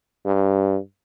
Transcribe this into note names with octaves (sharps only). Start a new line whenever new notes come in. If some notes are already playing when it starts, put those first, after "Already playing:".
G2